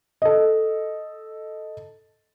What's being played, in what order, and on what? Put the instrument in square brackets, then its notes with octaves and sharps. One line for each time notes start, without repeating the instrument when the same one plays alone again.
[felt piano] A4 D#5